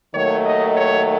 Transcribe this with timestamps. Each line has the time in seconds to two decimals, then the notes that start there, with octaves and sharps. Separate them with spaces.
0.14 D#2 D#3 F#3 A3 C#5
0.46 D#5
0.77 C#5